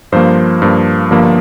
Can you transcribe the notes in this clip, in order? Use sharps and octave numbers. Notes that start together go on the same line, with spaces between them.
G2 F3 A#3 C5
G2 F3 A#3
G1 G2 F3 A#3